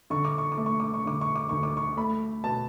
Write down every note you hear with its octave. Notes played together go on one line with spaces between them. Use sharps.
D3 C#6
D6
C#6
D6
A3
C#6
D6
C#6
D3 D6
C#6
D6
D2 C#6
D6
C#6
A3 B5
B2 A5